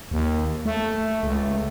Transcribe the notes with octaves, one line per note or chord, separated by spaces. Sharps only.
D#2
A3
C#2